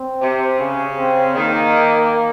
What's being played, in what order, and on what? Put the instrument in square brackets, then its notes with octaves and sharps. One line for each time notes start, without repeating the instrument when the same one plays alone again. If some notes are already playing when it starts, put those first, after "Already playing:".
Already playing: [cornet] C4
[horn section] C3
[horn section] C#3 [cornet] C#4
[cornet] C4
[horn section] D#3 [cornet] A#3